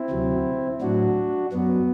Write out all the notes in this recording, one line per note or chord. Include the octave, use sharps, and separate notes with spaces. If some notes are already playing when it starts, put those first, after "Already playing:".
Already playing: C4 E4
D2 C3 F#3
A2 F#3 D4 F#4
F#2 F#3 B3